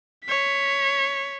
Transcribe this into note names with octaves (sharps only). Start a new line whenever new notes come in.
C#5 B6